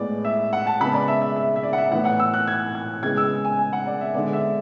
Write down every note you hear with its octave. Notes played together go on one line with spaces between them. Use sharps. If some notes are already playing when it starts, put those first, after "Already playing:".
Already playing: A2 G#3 B3 D5
E5
F#5
A5
C#3 G#3 B3 B5
D5
E5
E5
E5
E5
D5
F#5
E5
A2 E3 B3 F#5
F#5
E6
F#6
G#6
G#6
C#3 G#3 B3 G#6
E6
G#5
G#5
F#5
D5
E5
D3 G#3 B3 D5
E5